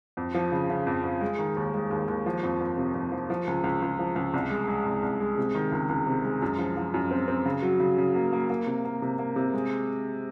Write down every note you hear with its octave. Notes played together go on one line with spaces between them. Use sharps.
F2
F3
C#3
C#3
F2
F2
G#3
D#3
D#2
G#3
D#2
D#2
F3
F2
F2
C3
F2
F3
F3
C#2
C#2
C#2
F3
C#2
C2
G#3
G#3
C2
C2
G#3
C3
D#3
C#2
C#2
C3
G#3
F#2
F3
F3
F#2
C4
C4
C#3
F#3
C#3
C#3
A#3
A#3
A#3
C3
A#3
C3
A#3
C3
G#3